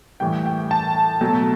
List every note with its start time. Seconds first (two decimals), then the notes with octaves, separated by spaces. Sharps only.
0.20 A2 E3 G3 G5
0.46 G5
0.71 A5
1.21 B2 F#3 A3